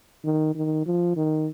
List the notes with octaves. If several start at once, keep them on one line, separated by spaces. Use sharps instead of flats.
D#3
D#3
F3
D#3